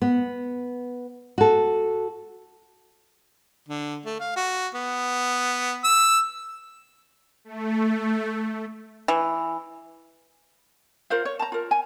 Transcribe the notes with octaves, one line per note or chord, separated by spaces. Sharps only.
B3
F#4 A4
D3
A3
F5
F#4
B3
E6
A3
E3
F4 A#4 C5 F5
C#5
A5 A#5
F4 A#4
G#5